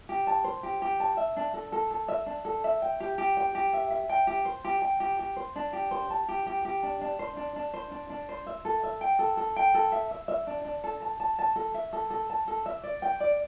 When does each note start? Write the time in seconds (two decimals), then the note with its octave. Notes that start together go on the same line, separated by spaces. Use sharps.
0.09 G4
0.27 A5
0.44 C5
0.63 G4
0.82 G4
1.00 A5
1.17 E5
1.37 D4
1.54 A4
1.72 A4
1.91 A4
2.08 E5
2.26 D4
2.45 A4
2.64 E5
2.82 G5
3.00 G4
3.18 G4
3.37 G5
3.55 G4
3.73 E5
3.90 E5
4.10 G5
4.27 G4
4.45 C5
4.65 G4
4.82 G5
5.00 G4
5.19 G4
5.36 C5
5.56 D4
5.73 G4
5.91 C5
6.10 A5
6.29 G4
6.47 G4
6.65 G4
6.83 D4
7.01 D4
7.19 C5
7.37 D4
7.56 D4
7.74 C5
7.91 D4
8.10 D4
8.29 C5
8.47 E5
8.65 A4
8.83 E5
9.01 G5
9.19 A4
9.37 A4
9.56 G5
9.74 A4
9.92 E5
10.11 E5
10.28 E5
10.47 D4
10.65 D4
10.84 A4
11.02 A5
11.20 A5
11.39 A5
11.56 A4
11.74 E5
11.93 A4
12.10 A4
12.30 A5
12.48 A4
12.66 E5
12.83 D5
13.02 G5
13.20 D5